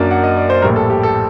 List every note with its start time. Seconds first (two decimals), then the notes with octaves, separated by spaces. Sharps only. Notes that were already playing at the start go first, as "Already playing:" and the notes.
Already playing: F#2 F#3 A#3 D4 D5
0.11 F#5
0.24 D#5
0.37 D5
0.50 C5
0.62 A#1 A2 G3 A#4
0.76 A4
0.90 G4
1.03 A4